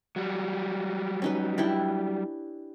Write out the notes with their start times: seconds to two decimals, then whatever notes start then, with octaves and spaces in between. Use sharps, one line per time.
0.16 F#3 G3
1.22 C#4 D#4 B4
1.58 D4 E4 G4